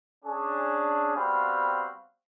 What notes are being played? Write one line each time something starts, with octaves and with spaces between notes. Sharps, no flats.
C#4 D4 G#4
G3 B3 C4 F#4 F5 B5